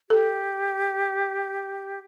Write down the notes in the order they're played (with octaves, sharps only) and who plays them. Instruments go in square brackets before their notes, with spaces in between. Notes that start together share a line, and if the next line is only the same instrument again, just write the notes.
[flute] G4 [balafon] A4